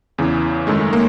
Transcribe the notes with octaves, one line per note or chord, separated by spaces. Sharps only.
E2 C#3 E3
F#2 D#3 G#3 A3
A#3